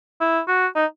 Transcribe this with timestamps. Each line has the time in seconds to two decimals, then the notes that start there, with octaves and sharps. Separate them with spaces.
0.21 E4
0.48 F#4
0.76 D#4